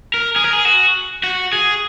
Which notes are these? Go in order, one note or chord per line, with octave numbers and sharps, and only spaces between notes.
A#4
G#4
A#4
G#4
F#4
F#4
G#4